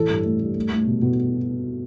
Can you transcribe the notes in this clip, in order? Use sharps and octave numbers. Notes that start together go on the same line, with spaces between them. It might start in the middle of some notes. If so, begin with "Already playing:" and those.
Already playing: A2 E3 A4
G2
A3
G2
A3
A3
B2
B2